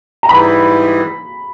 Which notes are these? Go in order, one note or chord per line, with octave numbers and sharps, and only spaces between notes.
A#5
G#2 E3 G3 B5